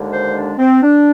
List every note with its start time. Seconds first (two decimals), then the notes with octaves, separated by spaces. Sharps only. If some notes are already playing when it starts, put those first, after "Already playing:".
Already playing: D#2 D3 G#3
0.12 C5
0.35 D4
0.59 C4
0.83 D4